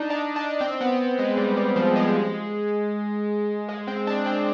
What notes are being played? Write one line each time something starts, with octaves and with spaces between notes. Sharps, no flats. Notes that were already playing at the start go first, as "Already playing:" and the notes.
Already playing: D4 D#4
D4
D4
C4
B3
G#3
G3
G3
F3
G#3
G#3
C4
D4
C4